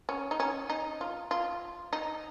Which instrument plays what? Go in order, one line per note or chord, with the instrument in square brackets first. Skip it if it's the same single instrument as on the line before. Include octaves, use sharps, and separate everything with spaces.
[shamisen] C#4
D#4
C#4
D#4
F4
F4
D#4